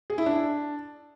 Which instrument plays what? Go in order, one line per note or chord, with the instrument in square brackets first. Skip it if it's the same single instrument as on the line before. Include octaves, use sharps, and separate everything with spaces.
[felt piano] G#4
E4
D4